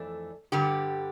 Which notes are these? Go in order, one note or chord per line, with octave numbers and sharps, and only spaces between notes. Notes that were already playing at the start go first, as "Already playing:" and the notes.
Already playing: F2 E3 A3 D4
G2 D3 G3 G4